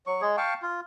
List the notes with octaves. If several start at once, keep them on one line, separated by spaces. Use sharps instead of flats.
F#3 C#6
G#3 G#4
F5 G5 A5 C#6
F4